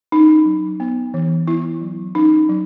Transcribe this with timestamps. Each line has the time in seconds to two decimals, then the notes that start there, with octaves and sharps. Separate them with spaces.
0.12 C#4 D#4
0.46 F#3
0.80 B3
1.14 E3
1.47 B3 E4
1.81 F#3
2.15 C#4 D#4
2.49 F#3